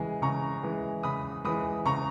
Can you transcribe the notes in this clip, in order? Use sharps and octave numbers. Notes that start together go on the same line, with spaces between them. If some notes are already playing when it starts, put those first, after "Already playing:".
Already playing: C#3 E3 G#3 G#5
C#3 A#5 C#6
E3 G#3
C#3 B5 D#6
E3 G#3 B5 D#6
C#3 A#5 C#6